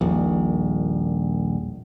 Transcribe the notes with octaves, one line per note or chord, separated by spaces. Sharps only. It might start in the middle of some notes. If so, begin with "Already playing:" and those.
D#1 A#1